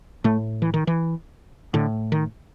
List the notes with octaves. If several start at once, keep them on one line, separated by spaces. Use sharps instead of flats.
A2 A3
E3
D#3
E3
A2 D3
D#3